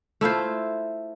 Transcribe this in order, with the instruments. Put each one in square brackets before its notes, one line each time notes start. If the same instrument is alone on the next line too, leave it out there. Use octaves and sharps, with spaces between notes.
[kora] A3 E4 F4 C5